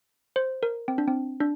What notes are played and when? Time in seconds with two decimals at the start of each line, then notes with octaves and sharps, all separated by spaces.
0.36 C5
0.63 A#4
0.88 C4
0.98 D4
1.08 C4
1.40 D4